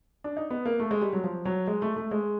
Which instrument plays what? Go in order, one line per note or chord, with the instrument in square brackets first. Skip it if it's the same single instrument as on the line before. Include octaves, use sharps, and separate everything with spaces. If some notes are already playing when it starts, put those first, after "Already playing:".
[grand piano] D4
D#4
B3
A#3
A3
G#3
G3
F#3
F3
F#3
G#3
A3
A3
G#3